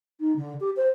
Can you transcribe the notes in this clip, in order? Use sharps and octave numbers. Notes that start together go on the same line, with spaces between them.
D#4
D3
G4
C5